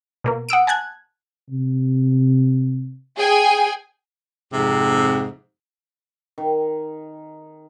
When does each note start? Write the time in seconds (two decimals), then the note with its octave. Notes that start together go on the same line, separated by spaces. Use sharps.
0.24 B2 A#3 A#4
0.49 F#5 D#6 E6 D7
0.67 G#5 A5 F#6 G#6
1.50 C3
3.18 G#4 G5 G#5
4.52 F2 G#2 C3
6.38 D#3